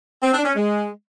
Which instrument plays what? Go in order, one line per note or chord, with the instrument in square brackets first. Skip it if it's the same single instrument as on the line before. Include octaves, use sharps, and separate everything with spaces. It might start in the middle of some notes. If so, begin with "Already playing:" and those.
[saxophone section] C4
D4
C#4
G#3